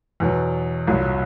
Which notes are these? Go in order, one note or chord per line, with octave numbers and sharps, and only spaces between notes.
E2 B2 F#3
C2 A#2 F#3